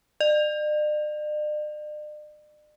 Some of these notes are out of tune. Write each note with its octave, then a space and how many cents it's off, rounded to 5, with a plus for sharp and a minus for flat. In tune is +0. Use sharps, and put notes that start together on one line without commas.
D5 +45